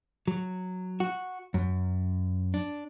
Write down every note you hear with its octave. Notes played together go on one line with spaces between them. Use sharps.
F#3
F#4
F#2
D4